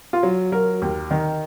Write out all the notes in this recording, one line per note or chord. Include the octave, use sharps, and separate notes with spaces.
F4
F#3
F#3 A#4
D#2
D#3